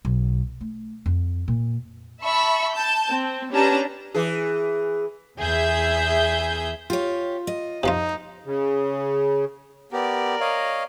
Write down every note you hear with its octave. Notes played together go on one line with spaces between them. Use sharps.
B1
A3
F2
A#2
E5 A5 B5 C#6
A5 G6
C4
C#4 D4 G4 B4 A5 A#5
E3 G#4
E2 G#4 E5 G6
F4 G4 C#5
D#5
C3 F3 D#4 F4
C#3
B3 G4 A#4 D5
C#5 D#5 F5